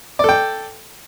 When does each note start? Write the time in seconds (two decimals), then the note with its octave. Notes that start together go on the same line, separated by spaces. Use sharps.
0.19 D5
0.24 A4
0.29 G5